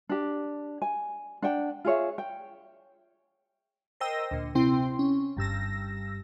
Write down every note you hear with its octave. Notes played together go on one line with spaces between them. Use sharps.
D4 G4
G#5
D4 F#5 G5
F4 G#4 C#5 E5
G5
A#4 C5 D#5 G5 E6 A#6
D2 A#2
C3 C4 E4 G5 C6
C#4
G1 G2 E6 A#6